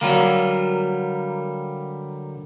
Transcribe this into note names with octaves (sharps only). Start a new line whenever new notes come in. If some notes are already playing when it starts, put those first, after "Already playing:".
D3 F#3 G3 A#3